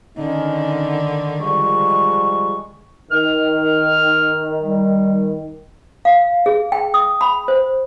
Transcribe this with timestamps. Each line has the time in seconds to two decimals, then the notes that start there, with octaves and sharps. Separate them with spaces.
0.17 D3 D#3 C#4 D#4
1.40 F3 G3 G#3 C#6
3.11 D#3 F6
4.62 G3
6.05 F5
6.46 G#4
6.72 G5
6.94 D#6
7.21 B5
7.48 C5